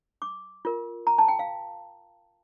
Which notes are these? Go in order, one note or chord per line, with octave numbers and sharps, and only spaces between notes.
D6
F4 A#4
A#5
A5
G5
F5